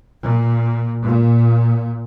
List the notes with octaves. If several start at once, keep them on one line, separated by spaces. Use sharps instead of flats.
A#2
A#2